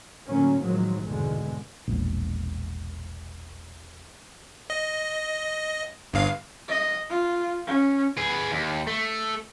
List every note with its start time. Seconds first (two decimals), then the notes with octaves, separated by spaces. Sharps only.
0.28 A2 D3 F#3 A#3 C#4
0.61 A2 D#3 F3 F#3 G#3
1.02 G#1 E2 G2 B2 D3 G#3
1.88 E1 A#1
4.70 D#5
6.13 G1 G2 F5
6.69 D#5
7.09 F4
7.67 C#4
8.17 G#4 B4
8.51 D#2
8.87 A3